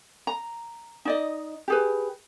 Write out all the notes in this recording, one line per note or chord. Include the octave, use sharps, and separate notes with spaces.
A#5
D#4 D5 D#5
G4 G#4 B4